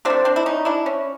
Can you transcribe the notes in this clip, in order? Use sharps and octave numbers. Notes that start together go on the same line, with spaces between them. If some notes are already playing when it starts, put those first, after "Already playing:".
C3 F3 C4 D4
A3
C4 D4
E4
C#4 D#4
D4 E4
C#4